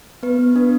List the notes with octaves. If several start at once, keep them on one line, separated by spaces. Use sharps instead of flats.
B3 B4
B3
D4 B4